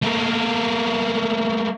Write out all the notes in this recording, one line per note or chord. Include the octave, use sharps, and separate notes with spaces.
A3 A#3